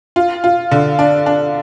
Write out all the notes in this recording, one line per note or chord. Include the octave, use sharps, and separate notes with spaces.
F4
F4
D3
D4
D4